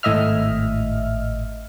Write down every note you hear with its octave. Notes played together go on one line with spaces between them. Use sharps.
G#1 A2 D#5 E5 F6